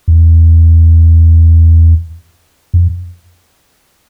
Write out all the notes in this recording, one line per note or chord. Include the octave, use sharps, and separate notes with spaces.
E2
F2